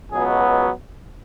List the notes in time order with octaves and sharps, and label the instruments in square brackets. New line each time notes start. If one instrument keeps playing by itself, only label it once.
[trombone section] C#2 B2 F#3 B3 G#4